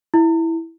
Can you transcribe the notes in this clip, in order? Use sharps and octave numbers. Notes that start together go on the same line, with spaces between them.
E4